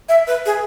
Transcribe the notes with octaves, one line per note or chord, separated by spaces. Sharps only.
E5
B4
G#4